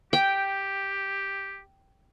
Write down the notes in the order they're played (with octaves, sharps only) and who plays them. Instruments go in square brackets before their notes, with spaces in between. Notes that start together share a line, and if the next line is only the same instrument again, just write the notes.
[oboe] G4 [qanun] G5